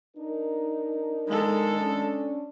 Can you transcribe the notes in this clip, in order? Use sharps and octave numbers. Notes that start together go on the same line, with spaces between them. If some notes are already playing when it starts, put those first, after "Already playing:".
D4 D#4 A#4
G#3 A4
C#4 D4